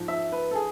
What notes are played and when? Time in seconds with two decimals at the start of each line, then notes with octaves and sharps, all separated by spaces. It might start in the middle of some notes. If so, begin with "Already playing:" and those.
Already playing: G#2 F3
0.08 E5
0.32 B4
0.51 A4
0.55 G#4